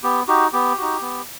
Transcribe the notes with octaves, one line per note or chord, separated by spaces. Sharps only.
B3 G4
D#4 F#4 G4
B3 G4
D#4 F#4
B3